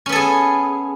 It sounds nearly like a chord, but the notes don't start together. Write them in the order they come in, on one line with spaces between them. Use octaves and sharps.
C#4 B3 A4 G#4